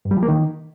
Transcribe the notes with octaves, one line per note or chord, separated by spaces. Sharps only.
G2
G3
F3
A#3
D#3